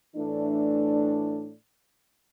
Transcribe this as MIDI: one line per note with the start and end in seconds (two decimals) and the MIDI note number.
0.16 1.53 45
0.16 1.53 52
0.16 1.53 57
0.16 1.53 62